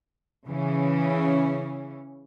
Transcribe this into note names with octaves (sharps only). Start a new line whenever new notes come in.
C#3 E3 C#4